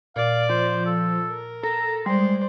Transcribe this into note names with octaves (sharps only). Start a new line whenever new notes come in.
A#2 D5 F5
F3 C5
A4
A#4
A4 A#5
G3 G#3 C5 D5 C6